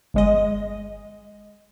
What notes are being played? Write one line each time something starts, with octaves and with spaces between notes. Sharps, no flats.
G1 G#3 D#5